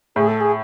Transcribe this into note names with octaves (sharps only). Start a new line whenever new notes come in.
A2 G#4
A4
G#4